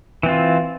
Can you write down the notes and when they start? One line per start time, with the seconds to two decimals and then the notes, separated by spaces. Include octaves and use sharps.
0.23 E3
0.26 C4
0.28 F4